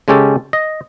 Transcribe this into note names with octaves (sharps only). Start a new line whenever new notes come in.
C#3 G#3 C#4 G4 A4
D#5